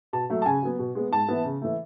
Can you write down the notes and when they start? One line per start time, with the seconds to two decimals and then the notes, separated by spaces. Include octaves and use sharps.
0.13 B2 A5
0.30 F#3 A3
0.42 A5
0.46 C#3 G#5
0.62 F#3 B3
0.79 B2
0.95 G#3 B3
1.12 G#2 A5
1.29 E3 B3
1.44 C#3
1.62 E3 A3